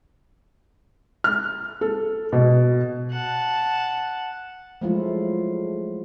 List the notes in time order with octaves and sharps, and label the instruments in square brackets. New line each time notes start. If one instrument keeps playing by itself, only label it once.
[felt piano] F6
A4
B2
[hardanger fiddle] F#5 A5
[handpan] F3 F#3 G#3 A3 E4 F4